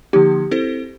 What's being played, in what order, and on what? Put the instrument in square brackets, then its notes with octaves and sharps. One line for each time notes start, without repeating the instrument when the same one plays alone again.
[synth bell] D3 F3 A#3 D#4 [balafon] G4
[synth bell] C4 E4 A4 C5